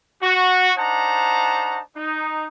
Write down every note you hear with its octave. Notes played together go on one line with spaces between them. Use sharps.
F#4
D4 D#4 C5 F#5 A5 A#5
D#4